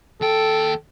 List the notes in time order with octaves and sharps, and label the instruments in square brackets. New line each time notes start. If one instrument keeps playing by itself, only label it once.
[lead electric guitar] D#2 G5 [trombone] A4